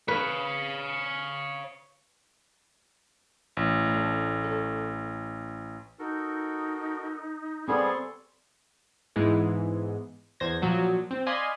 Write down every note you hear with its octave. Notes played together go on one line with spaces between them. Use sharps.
B4 C#5 F5
A1
A3 D4
A4 C#5
D#4 F#4 A4 A#4
G3 B3 C4 G#4 A4 D5 C6 C#6
G#2 E3 G#3 B3
E2 C5 G#6 A#6
A#2 F3 F#3 F#4
C4
D5 D#5 F5 G#5 B5 C6